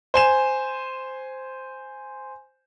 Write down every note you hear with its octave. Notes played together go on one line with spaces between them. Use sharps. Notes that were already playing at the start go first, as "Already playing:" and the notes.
C5 G#5 E7